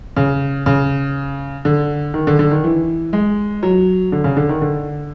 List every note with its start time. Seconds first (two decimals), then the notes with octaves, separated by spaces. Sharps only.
0.16 C#3
0.66 C#3
1.65 D3
2.14 D#3
2.27 D3
2.39 D3
2.51 D#3
2.64 E3
3.13 G#3
3.63 F#3
4.12 D3
4.24 C#3
4.37 D3
4.49 D#3
4.62 D3